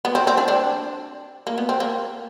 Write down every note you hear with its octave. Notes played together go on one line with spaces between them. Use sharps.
B3
C4
C4
C4 D4
C4 D4
A#3
B3
C4
A#3